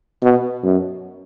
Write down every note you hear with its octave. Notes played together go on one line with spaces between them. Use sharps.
B2
F#2